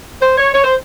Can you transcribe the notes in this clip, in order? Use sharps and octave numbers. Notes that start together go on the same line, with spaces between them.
C5
C#5
C#5
C5